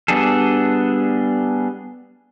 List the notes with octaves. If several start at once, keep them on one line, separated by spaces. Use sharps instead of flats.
G3 B3 D4 G#4 A4